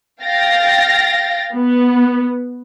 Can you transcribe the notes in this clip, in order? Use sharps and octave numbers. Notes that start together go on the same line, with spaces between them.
F5 G5 A6 A#6
B3